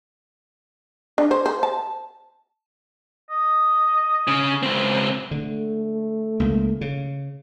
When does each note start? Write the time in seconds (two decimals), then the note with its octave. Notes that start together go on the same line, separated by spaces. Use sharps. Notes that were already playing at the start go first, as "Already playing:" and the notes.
1.18 D4
1.31 C5
1.46 C5
1.63 A5
3.30 D#5
4.28 C#3
4.63 C#2 C4
5.31 D3 A3
6.40 C#2 A#3
6.81 C#3